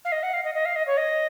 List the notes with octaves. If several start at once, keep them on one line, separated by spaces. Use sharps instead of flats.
F5
D#5
F#5
F5
D#5
D#5
F5
D#5
C#5
D#5